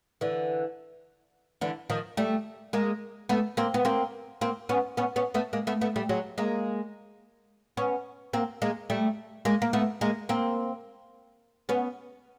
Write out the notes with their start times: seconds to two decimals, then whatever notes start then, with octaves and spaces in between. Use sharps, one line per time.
0.21 D3 E3
1.61 D3 E3
1.90 D#3 F3
2.17 G3 A3
2.73 G#3 A#3
3.29 A3 B3
3.57 A#3 C4
3.74 B3
3.85 A#3 C4
4.41 A#3 C4
4.69 B3 C#4
4.97 B3 C#4
5.16 B3 C#4
5.34 A3 B3
5.53 G#3 A#3
5.67 A3 B3
5.81 A3 B3
5.96 G3 A3
6.09 F#3 G#3
6.38 G#3 A#3
7.77 B3 C#4
8.33 A#3 C4
8.62 G#3 A#3
8.90 G3 A3
9.45 G#3 A#3
9.62 A#3
9.73 A3 B3
10.01 G#3 A#3
10.29 A#3 C4
11.69 B3 C#4